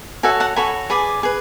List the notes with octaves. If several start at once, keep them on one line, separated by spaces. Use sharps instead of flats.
F#4 A4 C#5 E5 G#5
F#5 A5
F#4 A4 C#5 G#5 B5
G#4 B4 D5 G#5 B5
G#4 B4